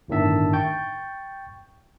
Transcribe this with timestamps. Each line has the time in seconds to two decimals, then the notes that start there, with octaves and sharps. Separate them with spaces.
0.08 G1 A2 D#3 D4 E5 A5
0.53 G5 C#6 G6 A6